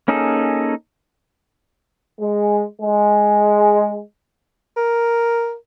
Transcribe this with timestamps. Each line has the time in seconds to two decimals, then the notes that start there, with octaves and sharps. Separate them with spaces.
0.08 A#3 C#4 D#4 G#4 A4
2.20 G#3
2.81 G#3
4.77 A#4